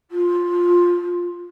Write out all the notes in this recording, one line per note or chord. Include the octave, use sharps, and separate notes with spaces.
F4